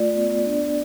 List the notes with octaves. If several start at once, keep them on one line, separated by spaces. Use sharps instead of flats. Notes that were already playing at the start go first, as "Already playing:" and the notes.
Already playing: A3 F4 D5
B3
D4